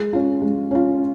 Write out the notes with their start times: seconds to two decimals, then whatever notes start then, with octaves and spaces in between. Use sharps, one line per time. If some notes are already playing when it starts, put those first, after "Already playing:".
Already playing: G#3
0.13 C#4 F4
0.42 G#3
0.71 C#4 F4